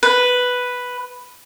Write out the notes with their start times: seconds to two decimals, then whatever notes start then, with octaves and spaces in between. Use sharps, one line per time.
0.03 B4